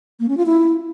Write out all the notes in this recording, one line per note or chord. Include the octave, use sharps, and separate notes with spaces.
A#3
C#4
F4
E4